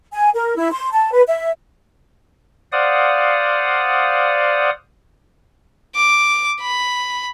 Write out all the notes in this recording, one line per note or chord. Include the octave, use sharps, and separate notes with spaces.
G#5
A#4
E4
C6
A5
B4
E5
C5 D5 F5 F#5 D#6
D6
B5